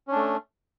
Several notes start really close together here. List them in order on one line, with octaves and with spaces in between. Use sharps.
C#4 D4 A3